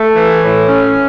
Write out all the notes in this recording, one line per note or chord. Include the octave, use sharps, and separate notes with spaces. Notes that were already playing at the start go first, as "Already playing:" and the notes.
Already playing: A3
E3
A2
C#4